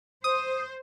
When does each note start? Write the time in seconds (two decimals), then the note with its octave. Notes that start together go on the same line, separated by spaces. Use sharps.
0.24 C5 D#6